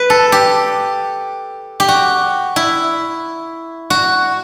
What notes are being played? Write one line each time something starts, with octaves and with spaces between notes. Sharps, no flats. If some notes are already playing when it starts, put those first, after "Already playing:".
Already playing: B4
A4
G4
G4
F#4
E4
F#4